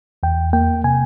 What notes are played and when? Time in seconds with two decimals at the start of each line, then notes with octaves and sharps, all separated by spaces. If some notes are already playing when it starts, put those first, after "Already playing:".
0.23 E2 G5
0.53 A#3 G5
0.84 C3 G#5